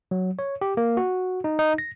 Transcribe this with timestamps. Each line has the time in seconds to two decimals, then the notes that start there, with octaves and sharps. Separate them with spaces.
0.11 F#3
0.39 C#5
0.61 G4
0.77 A#3
0.97 F#4
1.44 D#4
1.59 D#4
1.78 A#6